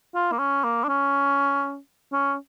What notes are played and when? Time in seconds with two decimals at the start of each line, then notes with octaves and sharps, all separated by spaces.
0.14 F4
0.32 A#3
0.38 C#4
0.64 A#3
0.84 D4
0.88 C#4
2.12 C#4